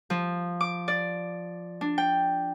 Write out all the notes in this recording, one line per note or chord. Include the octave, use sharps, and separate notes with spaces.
F3
D6
D5
D4
G5